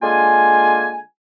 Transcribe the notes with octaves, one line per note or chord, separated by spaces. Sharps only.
D3 G#3 A#3 F4 G#5